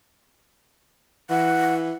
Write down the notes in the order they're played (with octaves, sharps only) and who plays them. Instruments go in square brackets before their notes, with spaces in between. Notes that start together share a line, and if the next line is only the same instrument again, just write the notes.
[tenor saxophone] E3 [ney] F#5